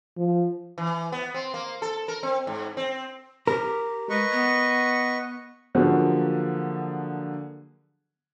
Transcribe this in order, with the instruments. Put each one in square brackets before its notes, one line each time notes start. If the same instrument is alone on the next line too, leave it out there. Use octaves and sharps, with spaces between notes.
[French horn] F3
[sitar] E3
B3
C4
A#3
A4
A#4
C4
G#2
C4
[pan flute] G4 [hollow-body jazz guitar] A#4
[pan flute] G#3 [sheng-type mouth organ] B4 D#5 C#6
[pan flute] B3
[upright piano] D3 F3 F#3 A#3 F#4 G#4